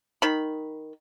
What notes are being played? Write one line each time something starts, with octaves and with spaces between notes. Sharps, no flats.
D#3 B5